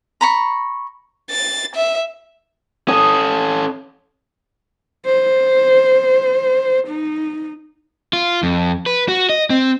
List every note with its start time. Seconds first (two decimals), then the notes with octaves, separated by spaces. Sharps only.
0.21 A#5 B5 C#6
1.31 A6
1.76 E5
2.88 C#4 A4 D#6
5.05 C5
6.88 D#4
8.13 F4
8.43 F2
8.86 B4
9.08 F#4
9.29 D#5
9.50 C4